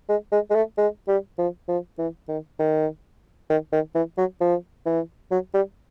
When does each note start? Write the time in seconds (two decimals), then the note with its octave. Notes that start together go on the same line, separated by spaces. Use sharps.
0.09 G#3
0.32 G#3
0.50 G#3
0.55 A3
0.78 G#3
1.08 G3
1.38 F3
1.68 F3
1.98 E3
2.28 D#3
2.59 D#3
3.50 D#3
3.73 D#3
3.95 E3
4.18 F#3
4.41 F3
4.86 E3
5.31 F#3
5.54 G3